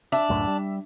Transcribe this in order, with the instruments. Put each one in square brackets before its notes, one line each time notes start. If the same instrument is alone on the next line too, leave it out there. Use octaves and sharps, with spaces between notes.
[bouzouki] D4 [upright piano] E5
[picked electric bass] C#2 F#2 A2
G3